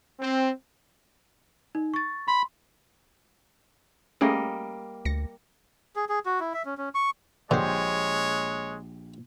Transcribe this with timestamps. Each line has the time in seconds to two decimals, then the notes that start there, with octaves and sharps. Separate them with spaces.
0.19 C4
1.75 D#4
1.94 C#6 A6
2.28 B5 C6
4.21 G3 A3 A#3 C#4 G#4 D#5
5.05 D2 A#6 C#7
5.96 G#4
6.09 G#4
6.26 F#4
6.40 E4
6.54 E5
6.65 C#4
6.78 C#4
6.95 C#6
7.51 A#1 D3 G#3 G4 C5 C#5